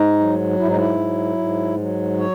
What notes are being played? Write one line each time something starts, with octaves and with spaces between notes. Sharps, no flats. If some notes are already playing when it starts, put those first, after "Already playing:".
Already playing: G#2 D#4
F#3
G#2 E4
D#4
E4
F#3
G#2
F#3
C#5